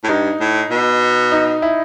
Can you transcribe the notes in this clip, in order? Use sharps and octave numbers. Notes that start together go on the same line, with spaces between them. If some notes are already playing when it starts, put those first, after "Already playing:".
A2
G2 D#4
A2
B2
D#4
E4